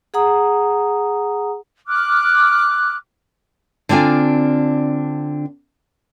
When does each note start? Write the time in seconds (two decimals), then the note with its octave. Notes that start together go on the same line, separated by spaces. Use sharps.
0.14 G#4 F#5 A#5 D#6
1.87 D6 F6 F#6
3.89 D3 C4 D4 F4 G#5